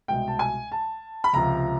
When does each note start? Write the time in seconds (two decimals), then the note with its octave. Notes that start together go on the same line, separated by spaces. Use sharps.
0.08 C2 B2 G#3 G5
0.28 A5
0.39 G#5
0.72 A5
1.24 B5
1.33 C#2 C3 F3 A#5